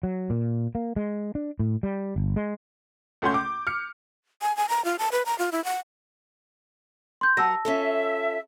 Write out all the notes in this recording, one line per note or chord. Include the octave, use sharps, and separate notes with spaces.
F#3
A#2
A#3
G#3
D4
A2
G3
G1
G#3
C#2 A3 C#4 F#5 C6 G6
D6
F6 C#7
G#5
G#5
A#5
F4
A5
B4
A#5
F4
E4
F#5
C6 G6
F#3 A#4 F#5 A5 E6 A#6
C#4 F4 A4 E5